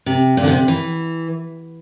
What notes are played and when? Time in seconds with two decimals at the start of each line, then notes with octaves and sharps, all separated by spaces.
0.06 C3
0.37 A#2
0.43 D3
0.48 C3
0.68 E3